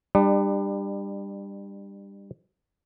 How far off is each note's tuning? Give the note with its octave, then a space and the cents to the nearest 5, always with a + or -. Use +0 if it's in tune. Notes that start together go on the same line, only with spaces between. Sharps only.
G3 +20 D4 +35